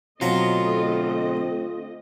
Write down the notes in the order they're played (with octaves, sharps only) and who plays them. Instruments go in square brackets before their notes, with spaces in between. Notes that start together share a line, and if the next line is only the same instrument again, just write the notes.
[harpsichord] B2 F#3 A#5 [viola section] D3 A3 D#5 [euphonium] C4 [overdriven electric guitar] F4